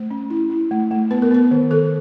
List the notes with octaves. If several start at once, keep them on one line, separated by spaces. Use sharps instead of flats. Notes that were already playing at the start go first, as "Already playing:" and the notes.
Already playing: A3 C5
C#4
E4
E4
A3
A3
B3 B4
A#4
B3 B4
D#3
D#3 A4